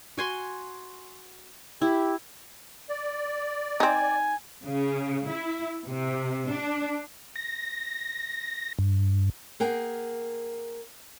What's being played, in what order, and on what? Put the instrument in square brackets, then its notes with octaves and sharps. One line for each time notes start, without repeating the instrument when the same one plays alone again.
[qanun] F#4 G#5 C6
[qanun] E4 [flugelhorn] G4
[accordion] D5
[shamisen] C4 D#4 [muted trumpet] G#5
[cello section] C#3
E4
C3
D4
[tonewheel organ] A#6
G2
[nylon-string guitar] A#3 G#4 A#4 F#5 G5